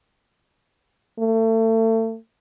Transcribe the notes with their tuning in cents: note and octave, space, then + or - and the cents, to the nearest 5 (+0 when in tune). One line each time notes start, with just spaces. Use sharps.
A3 +30